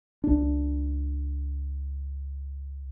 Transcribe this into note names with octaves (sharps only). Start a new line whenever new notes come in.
C#2 D4